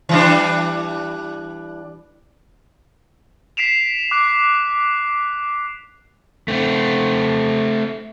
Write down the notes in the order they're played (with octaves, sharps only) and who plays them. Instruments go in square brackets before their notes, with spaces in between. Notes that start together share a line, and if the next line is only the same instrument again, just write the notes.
[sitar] E3 G3 D4
[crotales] B6 C7 D7 E7 F7
D6 F#6 D7
[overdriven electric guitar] A3 C4